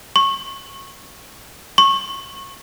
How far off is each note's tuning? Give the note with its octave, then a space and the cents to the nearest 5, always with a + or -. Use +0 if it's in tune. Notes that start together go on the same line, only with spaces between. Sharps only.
C#6 -15
C#6 -15